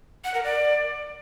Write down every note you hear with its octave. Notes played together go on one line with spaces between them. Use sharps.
F#5
A#4
D5